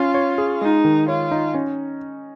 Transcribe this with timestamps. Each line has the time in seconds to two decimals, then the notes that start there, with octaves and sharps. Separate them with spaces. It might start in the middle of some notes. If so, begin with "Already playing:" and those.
Already playing: C#4 F4
0.14 C#5
0.38 G#4
0.61 G#3 D#4
0.85 D#3
1.08 F4 C#5
1.31 D#4
1.54 C#4